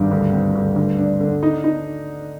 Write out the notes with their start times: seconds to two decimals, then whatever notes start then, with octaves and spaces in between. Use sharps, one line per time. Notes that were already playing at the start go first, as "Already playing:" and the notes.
Already playing: G#1 G2
0.11 D2
0.33 C4
0.55 D2
0.76 D2
0.98 D4
1.20 D3
1.43 D#4
1.64 D#4